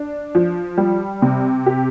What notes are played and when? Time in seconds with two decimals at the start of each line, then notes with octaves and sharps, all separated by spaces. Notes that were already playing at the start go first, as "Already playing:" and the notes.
Already playing: D4
0.35 F3
0.78 G3
1.22 C3
1.66 G4